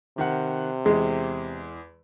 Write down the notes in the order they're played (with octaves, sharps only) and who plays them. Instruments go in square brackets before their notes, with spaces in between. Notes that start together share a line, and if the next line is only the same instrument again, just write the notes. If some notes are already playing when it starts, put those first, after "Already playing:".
[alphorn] C3 [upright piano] D#3 F#5
[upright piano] E2 [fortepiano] G#3